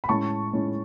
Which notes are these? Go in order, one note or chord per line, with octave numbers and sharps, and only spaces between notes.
B5
A2 G#3 C#4 A5 C#6
A2 G#3 C#4